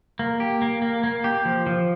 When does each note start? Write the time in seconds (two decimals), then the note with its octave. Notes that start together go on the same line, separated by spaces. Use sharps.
0.19 A#3
0.40 G4
0.62 A#3
0.82 A#3
1.04 A#3
1.24 G4
1.45 F3
1.67 F3